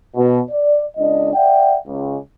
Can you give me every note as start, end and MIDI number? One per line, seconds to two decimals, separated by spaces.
0.16 0.40 47
0.51 0.83 74
0.97 1.31 37
0.97 1.31 62
0.97 1.31 75
1.34 1.78 74
1.34 1.78 76
1.34 1.78 78
1.34 1.78 79
1.87 2.16 37